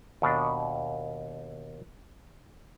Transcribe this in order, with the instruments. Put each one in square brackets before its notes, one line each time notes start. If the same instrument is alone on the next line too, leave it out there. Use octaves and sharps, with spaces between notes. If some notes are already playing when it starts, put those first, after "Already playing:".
[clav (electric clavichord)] D#2 B2 D4